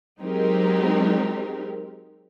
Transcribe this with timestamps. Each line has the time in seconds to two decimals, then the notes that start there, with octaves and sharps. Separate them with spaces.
0.20 F#3 G#3 C4 D#4 G4 A#4